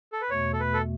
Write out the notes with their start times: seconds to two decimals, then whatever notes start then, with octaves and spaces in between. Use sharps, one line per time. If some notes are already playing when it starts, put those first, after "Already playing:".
0.13 A4
0.21 B4
0.30 E2 B2 A3 C#5
0.53 A4
0.60 B4
0.74 A4